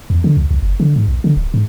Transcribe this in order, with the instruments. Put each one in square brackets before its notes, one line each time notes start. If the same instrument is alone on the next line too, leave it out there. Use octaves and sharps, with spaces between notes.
[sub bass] E2
D3
C#2
C2
F#1
D3
G#2
B1
D3
D1
G#2